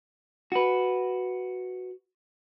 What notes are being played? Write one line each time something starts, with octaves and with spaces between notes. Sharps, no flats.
F#4 B4